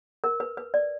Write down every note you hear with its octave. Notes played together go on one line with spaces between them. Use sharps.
A#4
B4
B4
D5